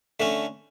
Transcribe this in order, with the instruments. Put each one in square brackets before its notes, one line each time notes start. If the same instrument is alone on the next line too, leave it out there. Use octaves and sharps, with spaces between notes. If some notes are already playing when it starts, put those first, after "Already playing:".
[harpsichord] D3 A3 C#4